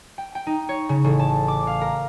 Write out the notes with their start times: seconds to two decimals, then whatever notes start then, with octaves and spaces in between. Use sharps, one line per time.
0.18 G5
0.35 G5
0.47 D#4
0.69 C#5
0.89 C#3
1.04 A1
1.19 A5
1.48 D6
1.67 F5
1.81 A#4